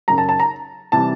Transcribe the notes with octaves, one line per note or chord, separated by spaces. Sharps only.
F#2 C#3 F#3 A#5
A5
A5
A#5
C3 E3 G3 A5